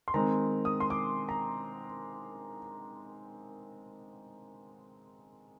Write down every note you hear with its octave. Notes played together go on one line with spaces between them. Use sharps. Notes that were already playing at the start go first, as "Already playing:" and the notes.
C6
D#3 G#3 C4 A#5
D#6
C6
D6
A#5